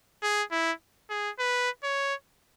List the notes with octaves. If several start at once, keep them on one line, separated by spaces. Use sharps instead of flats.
G#4
E4
G#4
B4
C#5